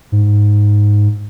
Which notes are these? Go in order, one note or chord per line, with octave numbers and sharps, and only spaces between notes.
G#2